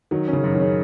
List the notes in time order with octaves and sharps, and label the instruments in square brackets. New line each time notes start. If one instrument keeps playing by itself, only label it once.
[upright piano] D#3 [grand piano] F#3
[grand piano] C#4
[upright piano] C#3
[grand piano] F#2
[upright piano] D#3
[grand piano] C#3